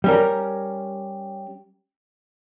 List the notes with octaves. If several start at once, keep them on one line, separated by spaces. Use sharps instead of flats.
G3 C#4 A#4